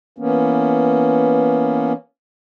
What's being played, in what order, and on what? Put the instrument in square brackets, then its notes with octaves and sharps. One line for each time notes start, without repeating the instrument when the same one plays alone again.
[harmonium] E3 A#3 B3 C#4